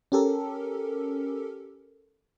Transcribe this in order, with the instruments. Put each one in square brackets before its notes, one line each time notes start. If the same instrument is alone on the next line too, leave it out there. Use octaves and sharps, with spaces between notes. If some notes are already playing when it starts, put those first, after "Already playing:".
[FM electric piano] C#4 G4 A4 A#4